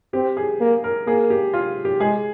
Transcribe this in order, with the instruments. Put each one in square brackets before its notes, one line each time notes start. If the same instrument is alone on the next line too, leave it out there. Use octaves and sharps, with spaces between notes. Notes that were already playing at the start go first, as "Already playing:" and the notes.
[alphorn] C4 [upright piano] G4
[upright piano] G#4
[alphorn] A#3
[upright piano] A#4
[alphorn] A#3 [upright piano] G#4
[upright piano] G4
F4
G4
[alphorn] G#3 [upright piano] G#4